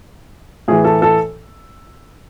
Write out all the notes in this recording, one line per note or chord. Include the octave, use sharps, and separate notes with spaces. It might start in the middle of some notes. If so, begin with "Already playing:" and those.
A2 E3 G#4
A4
A4